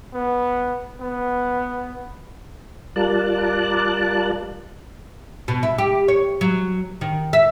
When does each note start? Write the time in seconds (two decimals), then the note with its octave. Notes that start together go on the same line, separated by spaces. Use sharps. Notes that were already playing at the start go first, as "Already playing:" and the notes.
0.14 B3
1.01 B3
2.96 G3 F4 A#4 D5 A5 F#6
5.48 B2
5.63 E4
5.78 G4
6.08 C#5
6.41 F#3
7.01 D#3
7.33 E5